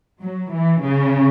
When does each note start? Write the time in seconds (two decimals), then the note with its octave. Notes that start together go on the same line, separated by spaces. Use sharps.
0.20 F#3
0.51 E3
0.81 C#3